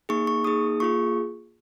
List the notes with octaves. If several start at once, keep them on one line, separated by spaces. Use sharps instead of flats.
A#3 D#4 G#4 C#6
C#6
A#3 D#4 G#4 D#6
A#3 F4 G#4 C#6